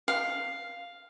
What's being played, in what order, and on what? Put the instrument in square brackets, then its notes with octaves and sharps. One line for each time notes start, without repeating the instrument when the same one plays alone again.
[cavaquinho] F5